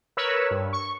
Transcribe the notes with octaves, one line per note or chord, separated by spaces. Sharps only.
A#4 B4 C#5 E6
G2
C#6